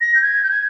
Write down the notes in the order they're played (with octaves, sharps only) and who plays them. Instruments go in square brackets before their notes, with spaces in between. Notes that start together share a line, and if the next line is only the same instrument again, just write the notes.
[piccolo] A#6
G6
G#6
G6
G#6